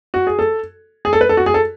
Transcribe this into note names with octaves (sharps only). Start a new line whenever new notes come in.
F#4
G#4
A4
G#4
A4
B4
A4
F#4
G#4
A4